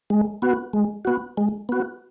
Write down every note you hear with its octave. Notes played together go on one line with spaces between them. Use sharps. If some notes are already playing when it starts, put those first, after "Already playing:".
G#3
B3 F#4
G#3
B3 F#4
G#3
B3 F#4